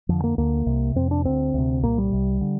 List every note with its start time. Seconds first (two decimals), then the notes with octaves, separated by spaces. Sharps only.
0.09 F2 D3 F3
0.24 A#3
0.38 D2 D3 A#3
0.66 C2 C3
0.95 F2 C3 C4
1.11 D4
1.25 D2 D3 C4
1.54 D2 C3
1.83 C2 A#2 A#3
1.98 G3
2.12 C2 C3
2.41 D3